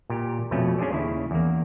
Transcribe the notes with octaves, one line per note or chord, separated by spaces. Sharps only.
A#2 G4
F2 B2 A3 C#4
C#4 D4 G#4 C5 D5
D#2 C#3 E4
E2 A#3